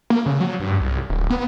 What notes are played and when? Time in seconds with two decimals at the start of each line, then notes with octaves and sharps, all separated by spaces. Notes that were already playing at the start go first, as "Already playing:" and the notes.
0.10 A#3
0.26 C#3
0.40 F#3
0.60 G2
0.81 C2
1.10 D1
1.30 B3